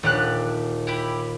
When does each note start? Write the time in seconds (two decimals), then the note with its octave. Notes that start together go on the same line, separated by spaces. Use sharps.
0.03 D#1 A3 G4 F#6
0.87 E4 G4 B5